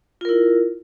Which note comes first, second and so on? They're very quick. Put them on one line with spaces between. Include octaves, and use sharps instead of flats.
F4 A#4 E4